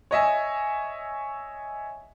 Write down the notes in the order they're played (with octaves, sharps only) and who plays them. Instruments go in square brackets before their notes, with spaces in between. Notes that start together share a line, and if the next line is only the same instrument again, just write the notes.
[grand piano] C#5 D#5 E5 G#5